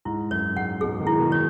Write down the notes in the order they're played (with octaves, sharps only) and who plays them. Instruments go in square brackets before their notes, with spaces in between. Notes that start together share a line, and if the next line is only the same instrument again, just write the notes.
[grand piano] G#2 [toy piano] E4
[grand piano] F#2 [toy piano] C#5
[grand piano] G#2 [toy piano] F#5
[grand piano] G#2 B2 [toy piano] G#4
[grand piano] B2 D#3
[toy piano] E4
[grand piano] B2 D#3
[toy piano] C#5